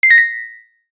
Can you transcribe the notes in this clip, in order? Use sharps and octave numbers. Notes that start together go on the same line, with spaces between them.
C7
A#6
B6